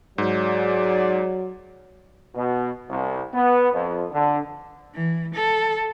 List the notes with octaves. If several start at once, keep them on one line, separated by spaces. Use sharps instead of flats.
G#2 F#3 G#4 D5
B2
C2
B3
F2
D3
E3
A4